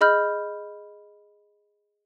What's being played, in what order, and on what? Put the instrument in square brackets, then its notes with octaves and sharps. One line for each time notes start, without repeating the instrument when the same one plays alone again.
[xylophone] G#4 D#5 B5 F6 G6